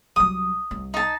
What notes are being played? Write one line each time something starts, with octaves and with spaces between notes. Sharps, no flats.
C2 F#3 D#6
C2
D#4 A5